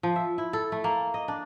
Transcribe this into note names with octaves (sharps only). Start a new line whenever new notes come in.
F3
E5
E4
A4
A3
A#3
D#5
D4